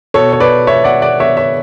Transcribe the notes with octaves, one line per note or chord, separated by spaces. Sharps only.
B2 A4 C#5
C#5
B4 D5
C#5 E5
D5 F#5
D5 F#5
C#5 E5
C#5 E5